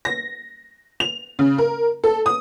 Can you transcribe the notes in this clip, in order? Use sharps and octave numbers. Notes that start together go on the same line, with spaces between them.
A#6
F7
C#3
A#4
A4
D#6